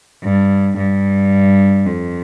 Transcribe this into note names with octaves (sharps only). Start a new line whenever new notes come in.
G2
G2
F2